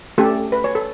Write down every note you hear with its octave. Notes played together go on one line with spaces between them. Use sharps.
A3 C#4 G4 A4
B4
C#5
A4